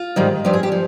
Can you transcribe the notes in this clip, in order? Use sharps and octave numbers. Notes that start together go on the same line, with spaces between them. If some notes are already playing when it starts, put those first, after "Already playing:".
Already playing: F4
G#2 D#3 G3
G2 F3 G4
G#4
G4
F3